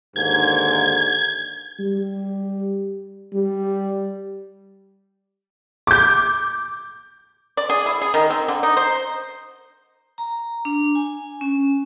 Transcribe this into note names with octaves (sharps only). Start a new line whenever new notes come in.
D#2 G#2 D3 G#6
G3
G3
D6 G6
D5
G#4
E4
G#4
D#3
C4
D3
D#4
C5
A#5
D4
G#5
C#4